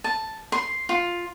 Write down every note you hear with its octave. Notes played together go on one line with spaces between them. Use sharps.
A5
C6
F4